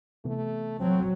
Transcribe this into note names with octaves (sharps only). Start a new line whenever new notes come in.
C3 E3 A3 B3
F#3 C4